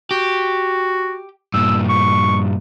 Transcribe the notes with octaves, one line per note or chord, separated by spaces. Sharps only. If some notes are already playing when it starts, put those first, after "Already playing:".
F#4 G4
G2 A#2 E6
C#6